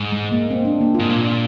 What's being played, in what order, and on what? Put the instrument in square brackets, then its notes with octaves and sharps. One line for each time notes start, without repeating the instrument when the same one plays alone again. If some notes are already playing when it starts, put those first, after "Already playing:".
Already playing: [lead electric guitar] G#2
[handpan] G#3
A#3
C4
D4
A#3
F4
[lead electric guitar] G#2
A#2